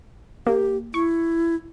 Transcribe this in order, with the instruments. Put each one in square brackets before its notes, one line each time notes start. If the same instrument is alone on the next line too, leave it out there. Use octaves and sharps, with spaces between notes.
[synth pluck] A#3 [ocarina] G4
[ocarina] E4 [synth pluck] C#6